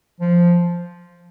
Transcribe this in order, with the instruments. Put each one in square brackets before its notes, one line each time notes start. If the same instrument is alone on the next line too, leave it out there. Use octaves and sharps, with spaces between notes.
[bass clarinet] F3